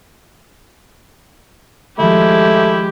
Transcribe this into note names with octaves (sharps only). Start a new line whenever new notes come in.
D#3 F3 G#3 A3 E4 G4